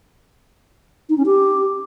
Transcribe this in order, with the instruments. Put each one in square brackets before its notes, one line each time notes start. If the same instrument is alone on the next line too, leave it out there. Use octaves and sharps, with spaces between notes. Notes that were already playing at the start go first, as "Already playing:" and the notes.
[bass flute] D#4
C#4
G4